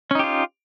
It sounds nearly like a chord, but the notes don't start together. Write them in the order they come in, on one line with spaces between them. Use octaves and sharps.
C#4 D#4 G4 F4